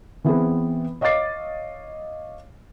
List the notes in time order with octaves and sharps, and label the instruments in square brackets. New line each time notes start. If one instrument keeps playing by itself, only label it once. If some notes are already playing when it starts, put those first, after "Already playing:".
[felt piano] E3 B3 C4 G#4
C#5 D#5 F5 D6 A6 C7